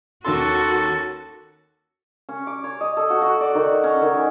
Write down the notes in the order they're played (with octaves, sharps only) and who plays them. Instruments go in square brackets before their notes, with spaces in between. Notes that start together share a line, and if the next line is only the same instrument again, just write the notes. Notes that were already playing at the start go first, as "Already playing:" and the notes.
[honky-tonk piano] D#2 C#4 C6 [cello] F#4 [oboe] A4
[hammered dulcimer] C#4
D6
C#5
D#5
A4
F#4
F#4
D5
D#3
C#4
D#3
G#5